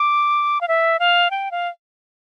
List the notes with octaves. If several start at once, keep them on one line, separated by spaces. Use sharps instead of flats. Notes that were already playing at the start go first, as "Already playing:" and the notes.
Already playing: D6
F5
E5
F5
G5
F5